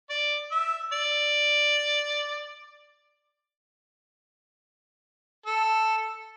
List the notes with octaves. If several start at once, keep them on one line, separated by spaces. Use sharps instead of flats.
D5
E5
D5
A4